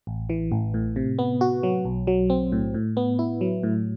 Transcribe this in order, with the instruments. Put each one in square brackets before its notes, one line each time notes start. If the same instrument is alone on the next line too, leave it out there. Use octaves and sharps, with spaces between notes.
[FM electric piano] A1
E3
A1
A2
C3
B3
F#4
F#3
B1
F#3
C4
A2
A2
B3
E4
F#3
A2